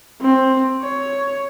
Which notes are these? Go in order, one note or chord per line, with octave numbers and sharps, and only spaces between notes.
C4
C#5